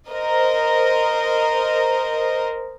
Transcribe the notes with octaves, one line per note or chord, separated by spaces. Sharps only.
A#4 C5 D#5